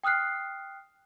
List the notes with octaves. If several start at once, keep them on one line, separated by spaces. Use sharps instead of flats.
G5 D#6 F6 F#6 C7